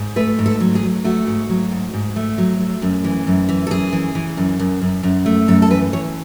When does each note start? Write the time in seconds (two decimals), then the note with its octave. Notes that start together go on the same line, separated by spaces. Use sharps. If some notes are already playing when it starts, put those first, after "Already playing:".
Already playing: G#2
0.16 A3 B4
0.39 G#2
0.46 A4
0.60 F#3
0.75 G#4
0.83 F#3
1.04 A3 F#4
1.27 G#2
1.49 F#3
1.72 G#2
1.94 G#2
2.16 A3
2.38 F#3
2.60 A3
2.82 F#2
3.04 E3
3.27 F#2
3.49 E3
3.67 A4
3.71 F#2 G#4
3.93 E3
4.15 E3
4.37 F#2
4.59 F#2
4.82 F#2
5.03 F#2
5.26 A3
5.48 F#2 A4
5.62 A4
5.70 E3 B4
5.93 E3 C#5